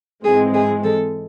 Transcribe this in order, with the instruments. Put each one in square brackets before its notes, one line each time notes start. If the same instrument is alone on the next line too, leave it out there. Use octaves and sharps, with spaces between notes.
[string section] G#2 E3 G#3 C4 [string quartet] G#4
[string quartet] G#4
A4